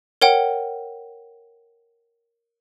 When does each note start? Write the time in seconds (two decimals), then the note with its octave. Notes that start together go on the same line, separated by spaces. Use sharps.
0.21 A#4 C#5 F#5 G5